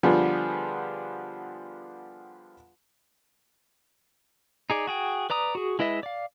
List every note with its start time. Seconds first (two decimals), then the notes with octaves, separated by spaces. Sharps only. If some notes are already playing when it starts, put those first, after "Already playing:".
0.03 D3 F3 G3 B3 F4 G#4
4.70 D#4 G#4 D5
4.87 F#4 G#4 G5
5.30 B4 D5 A#5 D#6
5.55 F#4 G#4
5.79 G#3 E4 B4 D#5 E5
6.03 D5 F5